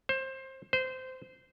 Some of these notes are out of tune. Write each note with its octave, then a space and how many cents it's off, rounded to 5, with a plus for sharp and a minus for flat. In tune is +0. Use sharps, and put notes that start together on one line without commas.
C5 +20
C5 -20